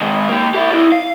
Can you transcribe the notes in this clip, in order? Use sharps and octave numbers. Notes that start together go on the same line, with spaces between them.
D#3 G#3
A#3 G4
E4 G4
E4 D5
F5